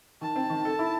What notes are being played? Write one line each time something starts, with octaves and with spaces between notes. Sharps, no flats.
D#3 A5
C4
D#3
A4
E4